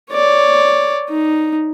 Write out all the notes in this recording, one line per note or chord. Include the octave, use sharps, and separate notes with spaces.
C#5 D5
D#4